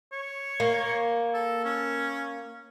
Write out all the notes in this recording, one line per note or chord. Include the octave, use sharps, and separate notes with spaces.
C#5
A#3
A4
C#4